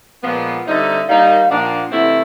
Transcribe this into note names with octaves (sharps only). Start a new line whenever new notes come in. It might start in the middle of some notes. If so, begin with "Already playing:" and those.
A#2 F3 G#3 B3
D3 G3 C4 D#4 E5
D#3 G3 A#3 D#4 F5
A#2 F3 A#3 D4 F#5
G5
F#5
C3 E3 A3 C4 E4
D#5